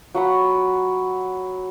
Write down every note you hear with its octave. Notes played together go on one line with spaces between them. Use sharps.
F#3 F#5 B5